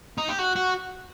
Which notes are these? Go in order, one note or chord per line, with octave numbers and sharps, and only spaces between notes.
D#4
G4
F#4
F#4